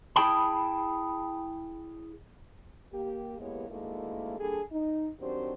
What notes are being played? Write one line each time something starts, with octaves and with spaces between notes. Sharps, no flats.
E4 G#4 G5 A5 B5
A#3 G4
E3 G#3 A#3 B3 G4 C#5
D2 D#3 G#3 A#3 E4 A4
G3 A#3 D4 G#4 A4
D#4
D#3 F#3 C4 D4 G4 C5